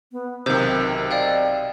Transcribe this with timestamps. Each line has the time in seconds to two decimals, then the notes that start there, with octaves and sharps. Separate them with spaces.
0.12 B3
0.46 B1 C3 D#3 C5 G6
1.11 D5 D#5 F5 G5